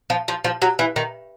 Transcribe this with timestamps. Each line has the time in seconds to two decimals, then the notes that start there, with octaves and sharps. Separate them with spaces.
0.10 F3
0.28 F3
0.44 F3
0.62 F#3
0.79 E3
0.96 D#3